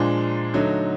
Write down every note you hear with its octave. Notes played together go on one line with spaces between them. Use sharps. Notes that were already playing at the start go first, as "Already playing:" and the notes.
Already playing: A#2 F3 G#3 D4
D3 F#3 A3 D#4